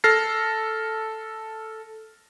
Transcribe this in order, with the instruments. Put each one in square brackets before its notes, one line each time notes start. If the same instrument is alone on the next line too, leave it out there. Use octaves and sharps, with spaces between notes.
[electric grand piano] A4 F6 A6 A#6 C7